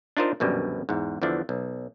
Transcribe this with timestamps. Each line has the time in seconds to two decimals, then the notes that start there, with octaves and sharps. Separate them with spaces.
0.17 D4 D#4 F4 A#4 C5 D#5
0.40 A#1 F#2 B2 D3 G3
0.89 E2 G#2
1.22 E2 D3 E3 F3 D4
1.49 B1